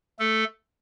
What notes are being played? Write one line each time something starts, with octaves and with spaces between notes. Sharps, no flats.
A3 A4